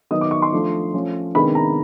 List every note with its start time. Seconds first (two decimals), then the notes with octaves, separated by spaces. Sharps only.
0.11 D#3 F#3 B3 D#4 D#6
0.21 D6
0.31 C#6
0.42 C6
0.53 F3 A3 D4
0.94 F3 A3 C#4
1.35 C3 D#3 G#3 B3 D4 B5
1.55 A#5